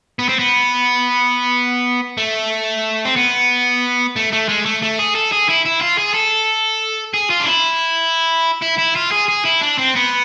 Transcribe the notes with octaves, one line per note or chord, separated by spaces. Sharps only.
B3
C4
B3
A3
C4
B3
A3
A3
G#3
A3
A3
G#4
A4
G#4
E4
E4
F4
G#4
A4
G#4
F4
D4
E4
E4
E4
F4
G#4
G#4
E4
D4
C4
B3